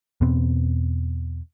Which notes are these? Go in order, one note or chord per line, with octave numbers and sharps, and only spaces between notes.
E2 B2 B3 C4